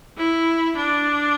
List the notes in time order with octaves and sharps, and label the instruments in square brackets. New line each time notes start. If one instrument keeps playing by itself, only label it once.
[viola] E4
D4